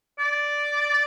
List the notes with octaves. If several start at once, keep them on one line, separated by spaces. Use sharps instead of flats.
D5